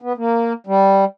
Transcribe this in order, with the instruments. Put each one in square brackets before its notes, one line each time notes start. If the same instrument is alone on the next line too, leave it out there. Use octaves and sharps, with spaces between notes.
[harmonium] B3
A#3
G3